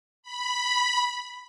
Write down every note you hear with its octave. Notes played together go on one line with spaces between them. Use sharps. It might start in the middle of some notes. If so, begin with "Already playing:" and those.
B5